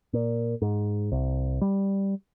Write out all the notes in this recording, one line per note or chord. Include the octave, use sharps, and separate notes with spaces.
A#2
G#2
C2
G3